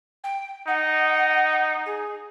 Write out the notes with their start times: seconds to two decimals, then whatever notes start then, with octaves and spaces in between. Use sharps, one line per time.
0.24 G5
0.67 D#4 F#5
1.86 G#4